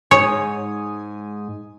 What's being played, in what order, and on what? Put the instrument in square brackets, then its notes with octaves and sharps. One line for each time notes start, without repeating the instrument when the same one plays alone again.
[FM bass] G#2 [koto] C#5 [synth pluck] G#5 D#6